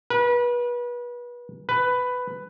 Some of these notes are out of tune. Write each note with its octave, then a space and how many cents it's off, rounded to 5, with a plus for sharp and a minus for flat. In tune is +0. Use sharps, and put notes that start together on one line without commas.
B4 -30
B4 +10